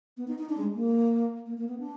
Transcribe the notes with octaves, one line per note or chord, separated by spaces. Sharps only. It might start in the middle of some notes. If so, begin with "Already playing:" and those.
B3
D#4
D#4
D4
G#3
A#3
A#3
A#3
B3
D4